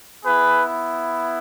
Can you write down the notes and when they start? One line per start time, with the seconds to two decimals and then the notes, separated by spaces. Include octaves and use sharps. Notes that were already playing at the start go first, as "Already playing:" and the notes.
0.25 B3 E4 G#4 B4